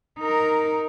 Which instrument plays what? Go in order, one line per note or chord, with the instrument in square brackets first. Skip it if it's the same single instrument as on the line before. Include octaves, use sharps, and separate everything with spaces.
[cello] D#4 A#4